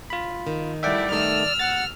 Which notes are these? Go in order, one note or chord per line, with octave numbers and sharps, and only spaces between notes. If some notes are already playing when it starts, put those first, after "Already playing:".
F4 B5
D#3
G3 A3 E4 D5 E5 F#5 G5
D#3 A3 B3 E6 F6
D#2 F#5 A6